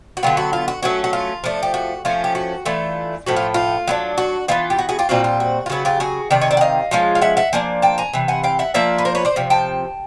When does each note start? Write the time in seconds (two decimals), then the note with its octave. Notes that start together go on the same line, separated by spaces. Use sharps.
0.17 F#4
0.23 D3 F#3 B3 F4 G4
0.37 F#4
0.53 F4
0.68 F#4
0.83 F#3 A3 C#4 F#4
1.04 F#4
1.13 F4
1.44 F3 A3 D4
1.63 G4
1.74 F#4
2.05 F3 A3 C#4 F4
2.24 G4
2.35 F#4
2.65 E3 A3 D4 F4
3.26 A2 F3 A3 F#4
3.36 F4
3.54 F4
3.87 F#3 B3 D4
4.18 F#4
4.48 E3 G#3 B3 F4
4.70 G4
4.79 F#4
4.89 F#4 G#4
4.99 F4 G4
5.09 A#2 G3 C4 F4 F#4
5.24 F4
5.40 F#4
5.66 F4
5.69 C#3 F#3 B3 F#4
5.85 F4 G4
6.00 F#4 G#4
6.30 C3 D#3 D5
6.41 C#5 D#5
6.51 D5 E5
6.57 F#5
6.61 D#5 F5
6.91 F3 G#3 C#4 F4
7.15 F5
7.22 E5 F#5
7.37 E5 F#5
7.53 F3 A#3 D4 G#5
7.82 G5 A5
7.98 G#5 A#5
8.13 C3 E3
8.28 F#5 G#5
8.44 F5 G5
8.59 E5 F#5
8.74 F3 A#3 D4 F4 D5 E5
8.98 B4
9.05 A#4 C5
9.15 B4 C#5
9.25 C5 D5
9.36 C3 F3
9.50 G5 A5